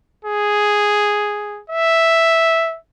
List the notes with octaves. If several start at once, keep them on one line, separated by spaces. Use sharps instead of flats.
G#4
E5